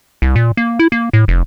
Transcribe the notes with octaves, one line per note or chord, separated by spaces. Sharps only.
C2
A#2
A#3
E4
A#3
A2
F1